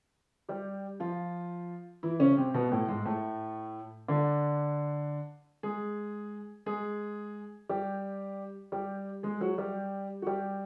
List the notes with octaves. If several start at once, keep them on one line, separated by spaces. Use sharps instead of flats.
G3 G4
F3 F4
E3 E4
C#3 C#4
C3 C4
B2 B3
A2 A3
G#2 G#3
A2 A3
D3 D4
G#3 G#4
G#3 G#4
G3 G4
G3 G4
G#3 G#4
F#3 F#4
G3 G4
F#4
G3 G4